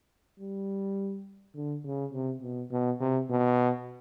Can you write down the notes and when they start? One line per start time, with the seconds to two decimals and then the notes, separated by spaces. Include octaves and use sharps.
0.39 G3
1.55 D3
1.85 C#3
2.13 C3
2.42 B2
2.71 B2
3.00 C3
3.29 B2